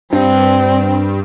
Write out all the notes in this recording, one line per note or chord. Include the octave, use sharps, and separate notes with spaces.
G2 C4